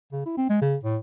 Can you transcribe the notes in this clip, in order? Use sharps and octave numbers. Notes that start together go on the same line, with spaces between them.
C#3
E4
C4
G#3
C#3
A2